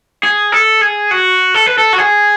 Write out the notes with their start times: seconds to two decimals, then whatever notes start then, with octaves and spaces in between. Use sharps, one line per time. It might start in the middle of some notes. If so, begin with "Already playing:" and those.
0.23 G#4
0.52 A4
0.81 G#4
1.11 F#4
1.54 A4
1.66 B4
1.78 A4
1.93 F#4
1.98 G#4